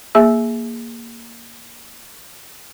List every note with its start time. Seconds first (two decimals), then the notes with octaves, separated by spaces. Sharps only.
0.15 A#3 G#4 E5 E6